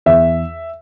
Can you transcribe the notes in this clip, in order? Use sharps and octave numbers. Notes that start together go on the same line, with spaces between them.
E2 E5